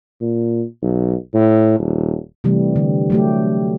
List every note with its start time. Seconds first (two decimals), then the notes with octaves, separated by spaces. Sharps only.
0.21 A#2
0.82 B1
1.34 A2
1.79 D#1
2.44 C3 E3 G3 A3
2.76 D3
3.10 F#3 A3 G4